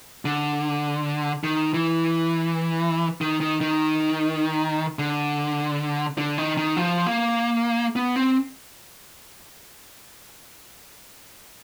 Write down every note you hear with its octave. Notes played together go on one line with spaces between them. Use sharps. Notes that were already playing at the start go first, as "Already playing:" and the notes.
D3
D#3
E3
D#3
D#3
D#3
D3
D3
D#3
D#3
F3
A#3
B3
C4